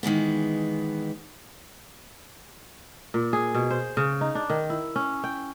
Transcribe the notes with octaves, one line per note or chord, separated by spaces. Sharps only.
D#3 E3 G#3 B3
A#2
G#4
B2
C5
C#3
D#4
D4
D#3
E4
C#4
G5